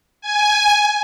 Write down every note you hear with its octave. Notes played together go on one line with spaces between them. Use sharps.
G#5